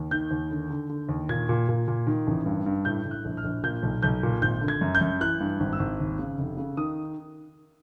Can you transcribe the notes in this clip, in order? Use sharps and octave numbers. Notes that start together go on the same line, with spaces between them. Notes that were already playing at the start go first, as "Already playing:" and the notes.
Already playing: D#2
D#3 G6
D#2
D3
D3
D3
D#2
A#2 G#6
A#2
A#2
A#2
D#3
A1
G2
G2
A2 G6
A2
F#6
A#1
F6
A#1
A#2 G6
B1
B1 G6
A#2
G#1 G6
D3
G#6
F#2
G6
F#2
E3 F#6
G2
G#1
E6
G#1
D#2
C#3
F1
C#3
D#3 D#6